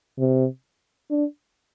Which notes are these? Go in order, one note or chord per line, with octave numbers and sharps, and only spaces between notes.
C3
D4